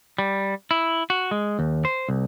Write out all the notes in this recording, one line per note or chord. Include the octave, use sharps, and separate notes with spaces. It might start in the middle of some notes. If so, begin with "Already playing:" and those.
G3
E4
F#4
G#3
D#2
C5
C2